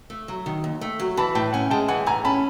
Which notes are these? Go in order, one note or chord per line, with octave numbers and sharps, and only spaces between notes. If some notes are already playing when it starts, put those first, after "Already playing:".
A3
F#3
D#3
D#2
A3
F#3
E3 A5 B5
A2 G5 A5
C#4 F#5 G#5
G#3 G5 A5
E3 F#5 G#5
A2 G#5 A#5
C#4 A5 B5